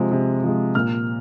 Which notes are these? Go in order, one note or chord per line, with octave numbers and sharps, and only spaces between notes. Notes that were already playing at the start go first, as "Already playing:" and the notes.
Already playing: C3 F3 G#3
C3
F3 G#3
A#2 F6